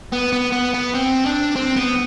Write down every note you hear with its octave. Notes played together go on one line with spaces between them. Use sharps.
B3
B3
B3
B3
C4
D4
C4
B3